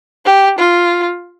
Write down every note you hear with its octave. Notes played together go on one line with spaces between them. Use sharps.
G4
F4